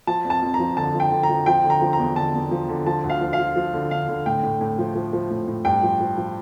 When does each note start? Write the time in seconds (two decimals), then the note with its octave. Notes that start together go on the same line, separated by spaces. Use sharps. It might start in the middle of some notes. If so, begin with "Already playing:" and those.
0.07 F3 A5
0.25 F2
0.30 A5
0.42 F2
0.54 A#5
0.59 F3
0.77 D3 A5
0.94 F3
1.00 G5
1.12 D3
1.23 A#5
1.29 F3
1.46 F3 G5
1.64 D3
1.70 A#5
1.82 F3
1.93 A#5
1.99 E2
2.16 D3 A5
2.34 E2
2.51 F3
2.69 D3
2.86 F3 A5
3.04 D2
3.10 F5
3.21 F3
3.33 F5
3.38 F3
3.56 F3
3.73 D3
3.91 D3 F5
4.09 D3
4.26 A2 G5
4.43 A2
4.61 A2
4.78 F3
4.95 F3
5.13 F3
5.30 A2
5.48 A2
5.65 G2 G5
5.83 F3
6.00 F3
6.17 F3